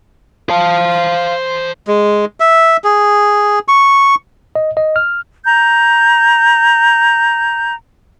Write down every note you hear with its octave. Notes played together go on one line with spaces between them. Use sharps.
C5 F5 A5
G#3
E5
G#4
C#6
D#5
D#5
F6
A#5 G6